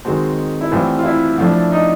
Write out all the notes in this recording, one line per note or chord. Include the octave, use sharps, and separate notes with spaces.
D#3 G#3 C4 F#4
E4
A2 E3 G3 C4 F4
F4
E4
F3 A3 D4
D#4